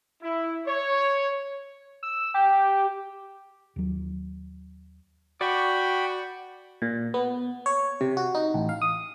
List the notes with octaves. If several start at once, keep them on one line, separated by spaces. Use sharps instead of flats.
E4
C#5
E6
G4
D#2 F#3
F#4 D5 G5 B5 C#6
A#2
B3
C#5
C3
F#4
D#4
A1
F5
D#6